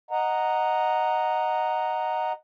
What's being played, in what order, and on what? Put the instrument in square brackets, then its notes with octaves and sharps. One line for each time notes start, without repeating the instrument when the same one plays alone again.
[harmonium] D#5 F#5 A#5